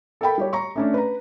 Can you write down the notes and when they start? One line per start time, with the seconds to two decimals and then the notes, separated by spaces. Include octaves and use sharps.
0.21 A4 A#4 G5 B5
0.38 G3 G4 C#5
0.53 A#5 C#6
0.76 A3 C#4 D4
0.94 B4 A#5